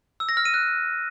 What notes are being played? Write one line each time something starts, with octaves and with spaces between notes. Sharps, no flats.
E6
A#6
F6
D#7
F#6